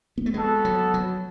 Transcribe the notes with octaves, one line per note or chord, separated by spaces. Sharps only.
B3
A3
G#3 B3 F#4 A4
F#3
F#3